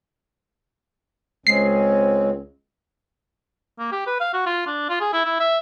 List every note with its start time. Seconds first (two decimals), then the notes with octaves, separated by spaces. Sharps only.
1.47 C#2 G#3 C4 C#4 C7
3.79 A#3
3.92 G4
4.07 B4
4.21 F5
4.34 F#4
4.46 F4
4.67 D4
4.89 F4
5.01 G#4
5.13 E4
5.25 E4
5.40 E5